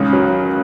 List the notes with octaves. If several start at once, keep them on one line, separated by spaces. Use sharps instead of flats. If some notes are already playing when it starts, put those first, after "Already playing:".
Already playing: C#2 D#3
F#3